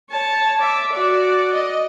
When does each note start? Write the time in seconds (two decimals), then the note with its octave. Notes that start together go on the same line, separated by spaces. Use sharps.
0.10 C#5 A5
0.61 E5 D6
0.92 F#4 D5
1.53 D#5